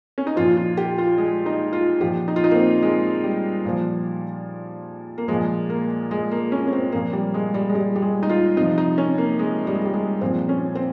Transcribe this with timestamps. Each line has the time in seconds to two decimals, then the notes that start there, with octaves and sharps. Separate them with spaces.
0.18 C#4
0.27 D#4
0.36 A#2 F3 F4
0.57 F4
0.77 G4
0.98 F4
1.18 G#3
1.46 D#4
1.73 F4
2.00 A#2 F3 G4
2.28 D#4
2.36 F4
2.44 D#4
2.51 A#3
2.55 C4
2.82 G#3
3.24 G3
3.65 A#2 F3
5.18 A#3
5.28 A#2 F3 G#3
5.70 A#3
6.11 G#3
6.31 A#3
6.52 C#4
6.67 C#4
6.72 C4
6.92 A#2 F3 A#3
7.13 G3
7.34 G#3
7.54 G3
7.69 G#3
7.75 G3
7.96 G3
8.02 G#3
8.23 D#4
8.29 F4
8.56 C3 F3 D#4
8.78 D#4
8.98 C#4
9.18 A#3
9.39 G#3
9.67 G3
9.75 G#3
9.85 G3
9.94 G#3
10.21 A#2 F3 C4
10.49 C#4
10.75 C4